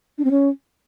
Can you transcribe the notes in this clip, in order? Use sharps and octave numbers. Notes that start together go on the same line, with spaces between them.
D4
C4
C#4